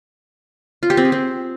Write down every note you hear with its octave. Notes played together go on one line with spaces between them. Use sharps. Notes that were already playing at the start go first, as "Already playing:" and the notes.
F4
G4
C4
G#4
C4